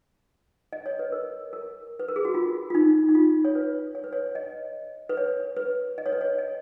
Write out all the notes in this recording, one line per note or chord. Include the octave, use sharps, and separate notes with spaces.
D#5
C#5
B4
A#4
A#4
B4
A#4
G#4
F#4
F4
F4
D#4
D#4
F4
C#5
B4
C#5
B4
C#5
D#5
B4
C#5
B4
D#5
C#5
B4
C#5
D#5